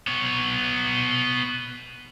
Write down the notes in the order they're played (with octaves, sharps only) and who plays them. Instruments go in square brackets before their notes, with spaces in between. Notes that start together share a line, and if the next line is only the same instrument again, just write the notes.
[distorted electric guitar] B3 C#5